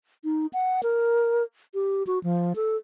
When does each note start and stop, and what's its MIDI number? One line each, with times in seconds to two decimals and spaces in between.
0.24 0.46 63
0.53 0.81 78
0.83 1.43 70
1.74 2.03 67
2.07 2.19 66
2.23 2.53 53
2.56 2.76 69